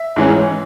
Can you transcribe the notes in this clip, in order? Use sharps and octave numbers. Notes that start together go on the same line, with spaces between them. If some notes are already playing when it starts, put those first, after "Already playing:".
Already playing: E5
G#2 E3 G#3 C#4